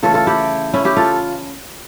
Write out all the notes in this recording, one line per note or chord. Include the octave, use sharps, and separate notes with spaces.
C#3 E3 A3 F4 A4
F4 A4
E4 G4
C#4 E4
E4 G4
F4 A4